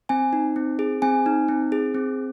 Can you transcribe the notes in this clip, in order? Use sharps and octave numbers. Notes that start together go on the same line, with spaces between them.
C4 G#5
D#4
C4
G#4
C4 G#5
D#4
C4
G#4
C4